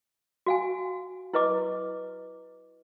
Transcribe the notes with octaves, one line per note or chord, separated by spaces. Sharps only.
F#4 F5 G#5
E4 B4 D#5 D6